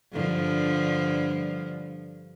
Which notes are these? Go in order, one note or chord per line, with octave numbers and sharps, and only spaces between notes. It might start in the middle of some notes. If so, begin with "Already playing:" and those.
G2 D3 F3